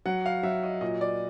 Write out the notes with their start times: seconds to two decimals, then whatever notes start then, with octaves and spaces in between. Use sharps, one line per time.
0.06 F#3 F#5
0.26 F5
0.43 F#3 E5
0.63 D#5
0.81 A#2 D#5
1.01 D5